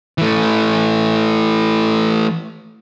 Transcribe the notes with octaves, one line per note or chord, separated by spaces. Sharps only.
E3 A3